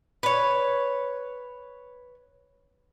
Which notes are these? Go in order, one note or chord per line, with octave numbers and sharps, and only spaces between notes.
B4 C#5